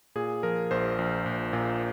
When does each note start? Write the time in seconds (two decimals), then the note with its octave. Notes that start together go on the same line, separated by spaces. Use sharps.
0.15 A#2 G#4
0.43 F3 A#4
0.71 A#1 C5
0.99 A#1
1.26 A#1
1.53 A#2